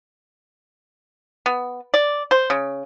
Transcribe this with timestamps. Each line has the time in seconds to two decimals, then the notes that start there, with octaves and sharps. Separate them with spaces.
1.46 B3
1.94 D5
2.31 C5
2.50 C#3